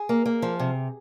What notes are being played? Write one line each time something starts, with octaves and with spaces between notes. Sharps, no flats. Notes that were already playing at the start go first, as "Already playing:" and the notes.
Already playing: G#4
A#3
A#3
F3
C3